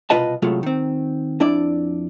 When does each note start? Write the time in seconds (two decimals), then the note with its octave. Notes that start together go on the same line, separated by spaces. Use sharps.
0.10 C2 B2 F4 B4 D#5 A5
0.42 A2 C3 F#3 G#3 A3 F4
0.63 D#3 C4
1.40 F2 D4 E4 D5